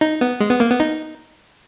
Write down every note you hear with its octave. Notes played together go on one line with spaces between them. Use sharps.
D#4
B3
G#3
B3
A#3
B3
D#4